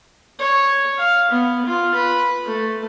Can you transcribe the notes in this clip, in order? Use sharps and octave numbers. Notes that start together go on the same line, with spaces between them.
C#5
F5
B3
F4
B4
A3